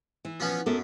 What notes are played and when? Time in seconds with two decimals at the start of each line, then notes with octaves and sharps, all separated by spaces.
0.25 E3
0.40 F3 B3 C#4
0.66 F#2 B3 A4 A#4